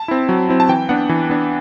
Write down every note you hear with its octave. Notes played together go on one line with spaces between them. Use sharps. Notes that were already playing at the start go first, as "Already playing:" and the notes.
Already playing: A5
C4 E4
F#3
C4 E4
A5
E3 G5
B3 D4 F#5
E3
B3 D4